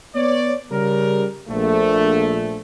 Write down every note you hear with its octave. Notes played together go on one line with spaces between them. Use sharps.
B3 C#5 D5
C#3 G3 A#4
A#1 A3